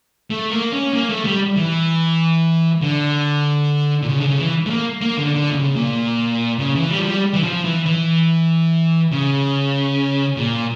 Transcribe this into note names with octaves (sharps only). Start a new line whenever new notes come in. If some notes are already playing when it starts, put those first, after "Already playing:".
A3
A#3
C#4
A#3
A3
G3
E3
D3
A#2
C#3
D3
C#3
E3
A3
A#3
A#3
D3
D3
A#2
C#3
A#2
C#3
E3
G3
F3
G3
E3
F3
E3
E3
C#3
A#2